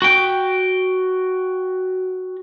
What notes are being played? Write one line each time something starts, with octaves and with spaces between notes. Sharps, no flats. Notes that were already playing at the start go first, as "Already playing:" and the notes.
F#4 G5